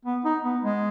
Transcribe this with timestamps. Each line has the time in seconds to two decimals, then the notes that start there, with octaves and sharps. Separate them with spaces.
0.05 B3
0.24 D#4
0.44 B3
0.63 G#3